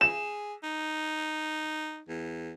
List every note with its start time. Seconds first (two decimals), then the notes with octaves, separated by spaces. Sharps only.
0.01 G#4 E7
0.63 D#4
2.08 E2